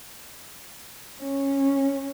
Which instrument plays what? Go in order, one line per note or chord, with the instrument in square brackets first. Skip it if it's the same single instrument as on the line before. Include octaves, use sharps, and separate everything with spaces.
[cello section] C#4